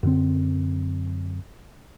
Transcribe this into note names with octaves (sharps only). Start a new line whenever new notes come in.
F#2 D3 C4